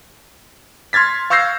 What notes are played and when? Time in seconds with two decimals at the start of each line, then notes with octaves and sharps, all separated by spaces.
0.93 C6 F6 G#6 A6 B6
1.30 F5 C#6 E6 G6 A#6 C7